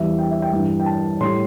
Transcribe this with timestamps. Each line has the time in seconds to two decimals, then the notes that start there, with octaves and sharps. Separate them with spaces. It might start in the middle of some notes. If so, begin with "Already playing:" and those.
Already playing: E2 E3 G3 E5
0.19 G5
0.31 E5
0.42 G5
0.52 G2 E3 G3
0.80 G5
0.86 A5
1.21 A2 G3 C6